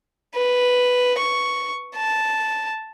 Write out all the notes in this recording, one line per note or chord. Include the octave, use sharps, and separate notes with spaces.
B4
C#6
A5